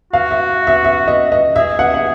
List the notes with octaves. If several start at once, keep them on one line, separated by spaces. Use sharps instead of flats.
F#4 F5
E5
E5
E5
D#5
D#5
G#4 E5
F#5
F#5